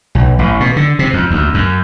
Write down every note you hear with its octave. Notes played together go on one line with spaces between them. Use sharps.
B1
A1
B2
D3
C3
F2
D2
F#2